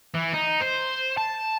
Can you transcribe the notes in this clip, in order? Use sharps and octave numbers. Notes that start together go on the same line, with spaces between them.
E3
D#4
C5
A5